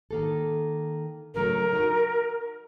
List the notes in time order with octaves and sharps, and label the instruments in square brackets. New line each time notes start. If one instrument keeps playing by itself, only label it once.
[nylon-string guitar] D#3 A#3 A4
[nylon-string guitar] C#3 F#3 A3 [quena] A#4
[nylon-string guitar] D#4 F#4